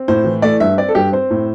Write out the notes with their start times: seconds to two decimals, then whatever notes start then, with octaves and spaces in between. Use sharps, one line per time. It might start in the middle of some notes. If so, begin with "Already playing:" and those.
Already playing: C4
0.08 A2 C5
0.25 E3
0.42 A3 D5
0.60 G2 E5
0.77 C4 D5
0.89 A4
0.95 G2 G4
1.12 C4 C5
1.31 A2